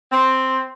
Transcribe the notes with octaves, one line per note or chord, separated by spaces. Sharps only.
C4